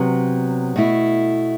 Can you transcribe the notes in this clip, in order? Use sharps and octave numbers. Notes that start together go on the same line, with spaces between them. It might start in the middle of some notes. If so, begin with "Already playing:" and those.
Already playing: C3 F#3 B3
B2 A3 E4